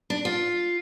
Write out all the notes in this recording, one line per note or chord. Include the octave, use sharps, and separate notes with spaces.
D4
F4